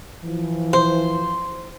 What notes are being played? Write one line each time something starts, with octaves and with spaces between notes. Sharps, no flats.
E3 F3
C5